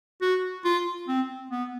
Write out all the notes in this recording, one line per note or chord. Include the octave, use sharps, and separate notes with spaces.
F#4
F4
C4
B3